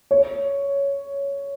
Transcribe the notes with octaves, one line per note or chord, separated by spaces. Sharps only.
C#5